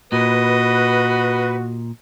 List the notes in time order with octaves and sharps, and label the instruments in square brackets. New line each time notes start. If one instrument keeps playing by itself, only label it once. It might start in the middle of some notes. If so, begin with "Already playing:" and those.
[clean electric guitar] A#2 [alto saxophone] F#4 [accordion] B4 [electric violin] D#5